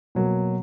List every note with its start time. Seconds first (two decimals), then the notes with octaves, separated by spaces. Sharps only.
0.15 B2 F#3 A#3